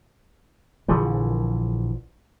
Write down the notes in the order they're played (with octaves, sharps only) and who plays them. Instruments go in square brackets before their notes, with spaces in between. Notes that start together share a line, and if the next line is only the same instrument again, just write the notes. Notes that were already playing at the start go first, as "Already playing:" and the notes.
[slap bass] A#1 D3 E3 F3